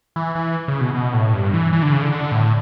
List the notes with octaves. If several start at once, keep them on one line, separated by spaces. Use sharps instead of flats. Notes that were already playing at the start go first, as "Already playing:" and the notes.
E3
E3
C#3
B2
B2
A2
G2
E3
E3
D3
C#3
D3
D3
A2